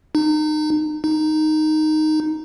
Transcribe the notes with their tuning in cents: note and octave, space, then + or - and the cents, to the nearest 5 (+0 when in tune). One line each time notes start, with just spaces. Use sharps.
D#4 -30
D#4 -5